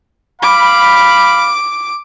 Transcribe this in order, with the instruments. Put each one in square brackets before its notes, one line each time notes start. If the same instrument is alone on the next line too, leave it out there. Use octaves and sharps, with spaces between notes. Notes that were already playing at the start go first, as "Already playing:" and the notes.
[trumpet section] F5 B5 [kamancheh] D6